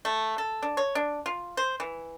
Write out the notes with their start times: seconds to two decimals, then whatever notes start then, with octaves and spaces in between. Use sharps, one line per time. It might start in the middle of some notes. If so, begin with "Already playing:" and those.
0.05 A3
0.38 A4
0.63 D4
0.77 C#5
0.95 D4
1.26 F4
1.57 C5
1.80 E3